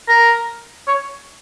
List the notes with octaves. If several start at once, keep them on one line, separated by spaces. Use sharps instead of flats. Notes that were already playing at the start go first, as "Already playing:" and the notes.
A#4
C#5